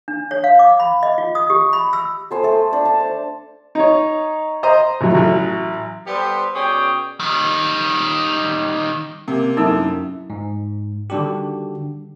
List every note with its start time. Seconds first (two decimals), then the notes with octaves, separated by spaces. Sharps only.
0.08 D4
0.31 C#5
0.44 F5
0.59 D6
0.80 B5
1.03 D#5
1.18 F4
1.35 D#6
1.50 G4
1.73 B5
1.93 E6
2.31 A4 C5 G#5 D#6
2.43 A3 A4
2.73 D4 D5
2.85 A5
3.00 C5
3.75 D#4 C#5
4.63 C5 D#5 A#5 C6
5.01 A1 F#3
5.15 A1 F#3
6.07 G3 B3 G4 A4 C5
6.55 B2 C#4 G#4 D5 G5
7.20 D#3 G3
9.27 C3 A#3
9.57 F#2 D#4 E4 A4 E6
10.30 G#2
11.10 D3 D#3 G3 D4 F#4 G4